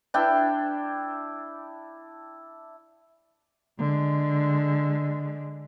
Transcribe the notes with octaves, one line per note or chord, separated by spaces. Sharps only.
D4 E4 G5
D3 G#3